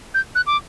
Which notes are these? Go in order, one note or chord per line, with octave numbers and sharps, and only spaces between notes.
G6
F#6
D6